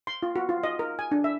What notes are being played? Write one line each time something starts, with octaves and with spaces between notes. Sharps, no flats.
C6
F4
F#4
F4
D#5
A#4
G#5
D4
E5